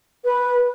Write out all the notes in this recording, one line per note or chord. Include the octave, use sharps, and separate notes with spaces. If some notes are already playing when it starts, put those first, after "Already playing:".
B4